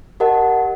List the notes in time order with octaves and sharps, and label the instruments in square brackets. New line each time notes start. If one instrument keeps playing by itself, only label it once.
[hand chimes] G4 A#4 D#5 F#5 A5